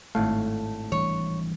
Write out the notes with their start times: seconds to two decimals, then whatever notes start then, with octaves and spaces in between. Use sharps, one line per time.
0.15 G#1 A2 A3 F5
0.92 E3 G3 D4 C#5